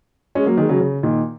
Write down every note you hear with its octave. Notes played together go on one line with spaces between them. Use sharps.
G#3 C#4
F#3 A#3
D#3 G#3
C#3 F#3
C#3
A#2 D#3